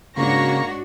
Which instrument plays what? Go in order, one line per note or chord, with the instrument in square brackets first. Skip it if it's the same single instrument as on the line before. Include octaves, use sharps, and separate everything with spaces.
[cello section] G#2 D4 F#4 [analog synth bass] C#3 [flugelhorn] A#3 [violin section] C#5 C#6 A#6